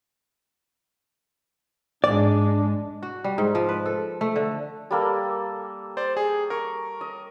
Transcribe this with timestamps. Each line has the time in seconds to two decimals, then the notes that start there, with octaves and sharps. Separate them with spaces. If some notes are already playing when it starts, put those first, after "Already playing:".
2.04 G#2 G#3 D4 D5
3.03 F#4
3.24 G3
3.38 G#2
3.55 F3
3.69 B4
3.86 A4
4.21 A3
4.36 D3
4.91 G3 A#3 A4
5.97 C5 D5
6.17 G#4
6.50 A#4 C#6
7.01 D#5